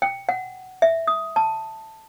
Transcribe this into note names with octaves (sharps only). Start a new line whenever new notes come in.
G5
F#5
E5
D#6
A5